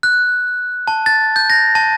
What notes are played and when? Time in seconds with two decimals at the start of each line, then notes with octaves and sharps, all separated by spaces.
0.03 F#6
0.88 A5
1.06 A6
1.36 G6
1.50 A#6
1.75 A5